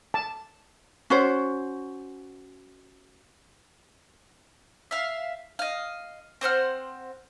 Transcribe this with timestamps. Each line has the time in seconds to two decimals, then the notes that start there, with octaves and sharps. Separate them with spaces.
0.14 A5
1.10 C#4 F#4 C5
4.91 E5 F5
5.59 D#5 F5
6.41 C4 C5 F#5 F6